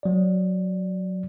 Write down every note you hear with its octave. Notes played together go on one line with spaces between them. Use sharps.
F#3 D5